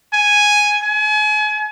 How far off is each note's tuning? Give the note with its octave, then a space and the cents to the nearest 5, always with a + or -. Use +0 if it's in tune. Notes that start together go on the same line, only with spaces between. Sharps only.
G#5 +0
G#5 +35